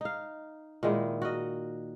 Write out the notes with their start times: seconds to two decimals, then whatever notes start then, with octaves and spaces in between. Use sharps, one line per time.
0.01 D#4 F5
0.83 A#2 D#3 G#3 E4
1.22 F#4 A#4 D#5